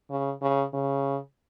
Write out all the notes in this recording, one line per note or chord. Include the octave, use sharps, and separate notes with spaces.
C#3
C#3
C#3